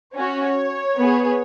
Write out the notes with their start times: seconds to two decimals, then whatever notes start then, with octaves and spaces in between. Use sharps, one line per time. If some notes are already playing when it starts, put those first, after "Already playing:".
0.15 C#4 F#4 C#5
0.99 B3 G#4